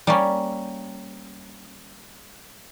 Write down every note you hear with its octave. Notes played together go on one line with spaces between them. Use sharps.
G3 A#3 C#4